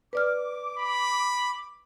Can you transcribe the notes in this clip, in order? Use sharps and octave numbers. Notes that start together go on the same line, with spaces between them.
B4 D5 D6 F6
B5